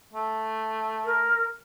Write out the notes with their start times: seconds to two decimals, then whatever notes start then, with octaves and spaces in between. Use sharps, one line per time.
0.13 A3
1.05 A#4